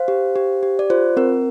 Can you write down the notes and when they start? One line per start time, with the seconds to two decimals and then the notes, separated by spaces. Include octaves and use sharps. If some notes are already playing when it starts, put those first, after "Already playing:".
Already playing: C5 F5
0.08 G4
0.36 G4
0.63 G4
0.79 D5
0.90 F4 C5
1.17 C4 A#4